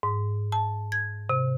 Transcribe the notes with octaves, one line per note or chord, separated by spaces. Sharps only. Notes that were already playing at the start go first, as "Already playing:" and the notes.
G#2
A5
G#6
C3